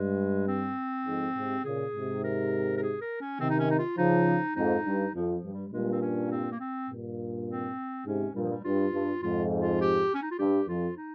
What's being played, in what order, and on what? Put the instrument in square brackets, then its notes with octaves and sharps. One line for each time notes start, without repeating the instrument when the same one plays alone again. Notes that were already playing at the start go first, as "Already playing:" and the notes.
Already playing: [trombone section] G2 [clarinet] G#3
[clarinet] C4
[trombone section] F2 G#2
G#2 C3
[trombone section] A#2 C#3 [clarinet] G#4
[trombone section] G#2 C3
[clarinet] A#4
A#4
G#4
A#4
C#4
[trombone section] C3 D#3 [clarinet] C4
[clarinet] D#4
C#4
D#4
F4
[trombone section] C#3 F3 [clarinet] D#4
[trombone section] F2 G#2 [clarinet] D#4
[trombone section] G2
[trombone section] F2 [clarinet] F3
[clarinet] F3
[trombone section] G2
[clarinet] G3
G3
[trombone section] G2 A#2 [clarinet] G#3
[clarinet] C4
C#4
C4
A#3
C4
[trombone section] G2 A#2
[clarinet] C4
[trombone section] G#2 C3 [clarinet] C#4
[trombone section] G2 A#2 [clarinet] G3
[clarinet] F3
G3
[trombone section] G2 [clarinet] F4
[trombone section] G2
[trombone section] F2 G#2 [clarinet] F4
[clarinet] F4
G4
C#4
D#4
F4
[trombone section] G2 [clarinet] G4
[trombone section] F2 [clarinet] F4
[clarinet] D#4